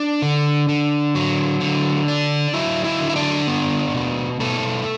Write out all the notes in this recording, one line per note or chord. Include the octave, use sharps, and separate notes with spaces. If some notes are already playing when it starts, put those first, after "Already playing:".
Already playing: D4 D5
D3
D3
F#3
D3
D4
F#3 E4 E5
E4 E5
D3
E5
D4 D5
B3
B2
B2 A3 A4